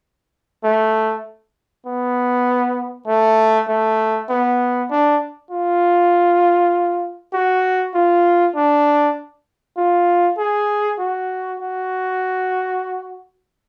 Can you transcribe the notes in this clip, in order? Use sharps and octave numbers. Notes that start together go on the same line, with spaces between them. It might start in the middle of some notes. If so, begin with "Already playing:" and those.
A3
B3
A3
A3
B3
D4
F4
F#4
F4
D4
F4
G#4
F#4
F#4